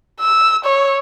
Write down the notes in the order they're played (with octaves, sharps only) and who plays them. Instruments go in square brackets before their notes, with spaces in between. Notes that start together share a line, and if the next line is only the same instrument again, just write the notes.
[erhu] E6
C#5